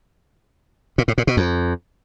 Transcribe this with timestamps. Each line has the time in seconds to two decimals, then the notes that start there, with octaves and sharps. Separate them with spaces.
0.98 A#2
1.08 A2
1.18 A#2
1.27 B2
1.37 F2